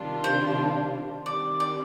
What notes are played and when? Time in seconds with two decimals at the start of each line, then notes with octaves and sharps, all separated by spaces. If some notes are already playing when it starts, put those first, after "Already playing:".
Already playing: C3 D#3 G3 D4 F4
0.24 C5
1.26 D#3 G3 C4 D5
1.60 D5